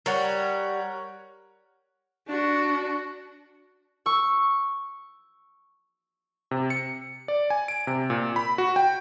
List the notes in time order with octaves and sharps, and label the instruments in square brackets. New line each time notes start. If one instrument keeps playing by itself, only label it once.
[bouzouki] G3 [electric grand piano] A#4 C#5 F#5
[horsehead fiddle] D4 F#4
[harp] C#6 E6
[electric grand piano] C3
C#7
D5
G#5
D7
C3
A#2
B5
F#4
G5